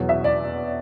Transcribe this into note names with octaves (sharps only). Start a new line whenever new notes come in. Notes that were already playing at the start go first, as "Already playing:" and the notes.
Already playing: E2 B2 F#3
E5
D5